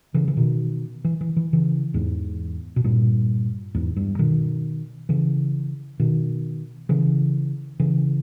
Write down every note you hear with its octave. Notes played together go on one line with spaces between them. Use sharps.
C#3 E3
E3
B2 D#3
E3
E3
E3
C#3 E3
E2 G#2
B2
G2 A#2
E2 G#2
G2
B2 D#3
C#3 E3
B2 D#3
C#3 E3
C#3 E3